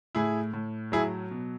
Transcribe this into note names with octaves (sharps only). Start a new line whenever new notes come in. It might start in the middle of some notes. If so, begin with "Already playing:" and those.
A2 E4 G#4
A2
F#3 E4 G#4
B2